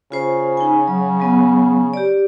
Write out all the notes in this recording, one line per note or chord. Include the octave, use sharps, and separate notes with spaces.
C#3 F4 C5
D#4 G#5
F#3
F#3 B3
G4 D5